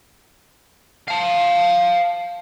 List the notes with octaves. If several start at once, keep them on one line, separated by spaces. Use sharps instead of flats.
F5 A5